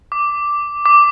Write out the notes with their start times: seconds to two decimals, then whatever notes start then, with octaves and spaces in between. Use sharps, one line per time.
0.12 D6
0.86 D6